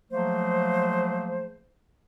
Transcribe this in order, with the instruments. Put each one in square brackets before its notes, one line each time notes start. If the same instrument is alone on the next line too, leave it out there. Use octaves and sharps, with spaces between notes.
[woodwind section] F3 F#3 A3 A#3 G#4 C5